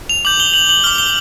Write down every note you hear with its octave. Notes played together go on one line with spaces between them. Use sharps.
F7
D6 G6 F#7
G7
F#7
F#7
D6 F6 G7
G7